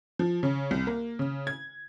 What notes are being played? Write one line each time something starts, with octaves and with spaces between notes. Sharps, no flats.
F3
C#3
C2
A#3
C#3
G#6